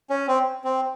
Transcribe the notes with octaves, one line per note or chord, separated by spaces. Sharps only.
C#4
C4
C4